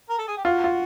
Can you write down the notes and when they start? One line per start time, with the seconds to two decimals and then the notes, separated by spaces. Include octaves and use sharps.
0.09 A#4
0.18 A4
0.28 G#4
0.37 G4
0.44 F4 F#4
0.64 F4